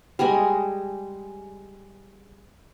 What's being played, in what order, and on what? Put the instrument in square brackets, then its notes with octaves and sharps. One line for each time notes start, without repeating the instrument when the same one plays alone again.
[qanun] G3 G#3 D#5 G#5